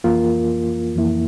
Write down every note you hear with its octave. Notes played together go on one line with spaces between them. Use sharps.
F2 E3 A#3 F4 A#4
F2 E3 A#3 E4